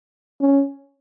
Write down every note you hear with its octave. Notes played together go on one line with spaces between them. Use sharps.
C#4